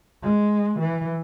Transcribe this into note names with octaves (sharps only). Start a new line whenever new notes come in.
G#3
E3